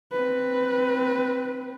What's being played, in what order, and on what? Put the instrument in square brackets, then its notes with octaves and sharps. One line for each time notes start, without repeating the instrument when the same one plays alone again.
[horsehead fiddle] C4 B4